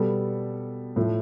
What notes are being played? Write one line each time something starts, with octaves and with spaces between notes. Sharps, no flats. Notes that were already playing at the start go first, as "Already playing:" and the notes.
Already playing: B2 G3 B3 A4
A2 F3 A3